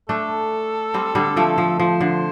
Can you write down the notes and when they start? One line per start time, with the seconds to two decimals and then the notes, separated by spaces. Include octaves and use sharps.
0.09 A3 D4 A4
0.94 G3 C4
1.15 D3 G3
1.37 F3 A3
1.58 F3
1.79 F3 C5
2.01 D3